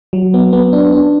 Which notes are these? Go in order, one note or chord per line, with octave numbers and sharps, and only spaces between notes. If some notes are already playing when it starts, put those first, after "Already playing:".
F#3
B3
B3
D4
D4